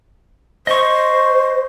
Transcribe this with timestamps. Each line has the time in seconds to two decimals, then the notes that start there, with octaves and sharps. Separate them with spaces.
0.67 C5 D#5 C#6